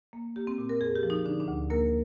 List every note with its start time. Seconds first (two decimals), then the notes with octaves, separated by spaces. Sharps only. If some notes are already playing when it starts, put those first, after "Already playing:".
0.13 A#3
0.36 A#3 G4
0.47 C4
0.58 A#2
0.69 A#4
0.81 F2 G#4
0.96 G4
1.03 F3
1.10 D#4
1.25 D3 D4
1.40 D4
1.48 D2
1.70 A#3 A#4